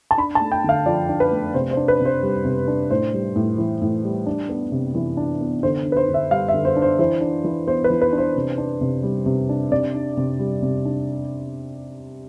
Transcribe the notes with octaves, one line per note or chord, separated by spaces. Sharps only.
A5
D4 B5
A5
A3
G5
D3 F5
F3 D5
D4
B4
A3
C3 C5
C5
D4
B4
C3
C5
G3
C3
D4
A2 C5
G3
A2
E3
A2
G3
D4
B3
C3
E3
D4
B3
D3 C5
D4
B4
C5
D3
E5
G3 F5
E5
D3
C5
D4
C5
E3 C5
D4
E3
B3 C5
B4
E3
B4
D4
C5
C3
D4
C3
G3
C3
D4
C3 D5
D4
C3
G3
C3
D4